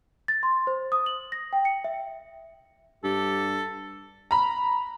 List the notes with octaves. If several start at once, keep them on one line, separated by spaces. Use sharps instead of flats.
A6
C6
C5
D#6
F#7
A#6
G5
C#7
E5
G2 G4 A4
A#5 B5